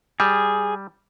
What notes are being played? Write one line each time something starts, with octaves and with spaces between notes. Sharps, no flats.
G3 G#4